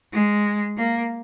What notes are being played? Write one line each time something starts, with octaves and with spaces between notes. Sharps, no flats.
G#3
A#3